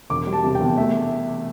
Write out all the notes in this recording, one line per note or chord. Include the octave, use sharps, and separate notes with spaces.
E1 D6
G3
A5
C3
G5
E2
A3 E5